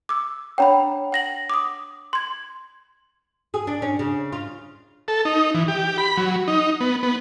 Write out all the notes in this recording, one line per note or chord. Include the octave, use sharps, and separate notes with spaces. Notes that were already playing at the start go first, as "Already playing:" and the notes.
D6 E6
D4 C#5 F#5 G5 A#5 B5
F#5 A#6 F#7
D6 D#6
C6 G#6
G#4
D4
C#4
C#3
F4
A4
D#4
E3
G4
B5
F#3
D#4
B3
B3